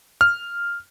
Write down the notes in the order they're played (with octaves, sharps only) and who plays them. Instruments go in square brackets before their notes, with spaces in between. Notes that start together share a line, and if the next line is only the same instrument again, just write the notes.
[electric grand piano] F6